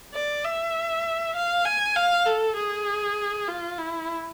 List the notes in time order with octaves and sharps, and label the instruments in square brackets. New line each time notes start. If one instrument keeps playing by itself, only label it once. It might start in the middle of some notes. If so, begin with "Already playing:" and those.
[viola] D5
E5
F5
G#5
F5
A4
G#4
F4
E4